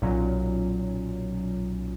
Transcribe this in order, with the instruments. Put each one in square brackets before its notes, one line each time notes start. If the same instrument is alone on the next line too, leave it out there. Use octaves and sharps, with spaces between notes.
[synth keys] B1 A#2 F#3 C#4